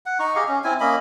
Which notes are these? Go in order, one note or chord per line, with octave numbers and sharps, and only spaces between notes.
F#5
D#4 C#6
G4 G#4 D#5 F5
C#4
C4 E4 G#5
A#3 C#4 D#5 B5